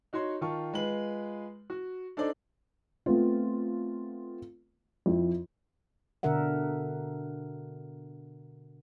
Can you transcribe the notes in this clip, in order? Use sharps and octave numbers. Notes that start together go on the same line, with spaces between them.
D#4 F#4 C#5 C6
D#3 F4 A5 C#6
G#3 F4 B4 F#7
F#4
D4 D#4 A4 C5 D5
A3 B3 C4 F4
F2 E4 F4
B2 D3 D4 A#4 E5 F#5